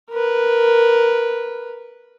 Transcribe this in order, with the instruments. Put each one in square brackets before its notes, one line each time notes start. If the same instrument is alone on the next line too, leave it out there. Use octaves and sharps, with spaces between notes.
[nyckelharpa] A#4 B4